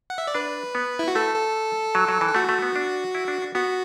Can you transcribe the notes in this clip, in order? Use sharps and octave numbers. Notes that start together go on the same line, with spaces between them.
F#5
E5
D5
D4 B4
B3
E4
F#4
A3 A4
A4
F#3
F#3
E3
A4
A3 F#4
A3
B3
D4
E4
D4
D4
B3 F#4